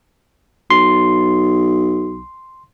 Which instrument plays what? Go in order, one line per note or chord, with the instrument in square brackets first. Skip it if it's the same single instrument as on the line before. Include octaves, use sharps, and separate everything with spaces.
[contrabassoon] B1 [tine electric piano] C6